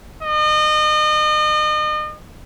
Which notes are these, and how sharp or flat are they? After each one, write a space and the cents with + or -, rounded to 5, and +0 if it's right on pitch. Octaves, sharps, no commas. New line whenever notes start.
D#5 -35